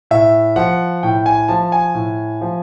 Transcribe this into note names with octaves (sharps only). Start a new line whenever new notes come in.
A2 E5
F3 F#5
A2 G5
G#5
F3 A5
G#5
A2
F3